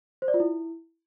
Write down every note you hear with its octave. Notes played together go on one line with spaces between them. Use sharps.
C5
D5
F4
E4